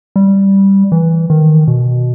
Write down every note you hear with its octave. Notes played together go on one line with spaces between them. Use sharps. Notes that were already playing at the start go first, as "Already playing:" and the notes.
G3
E3
D#3
B2